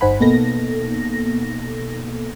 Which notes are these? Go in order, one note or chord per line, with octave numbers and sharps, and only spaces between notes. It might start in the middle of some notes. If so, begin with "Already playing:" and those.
G1 D#4 C5 F#5 G#5 B5
B2 A#3 B3 D#4 A4 A#6